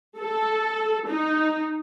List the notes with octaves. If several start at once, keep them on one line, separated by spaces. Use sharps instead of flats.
A4
D#4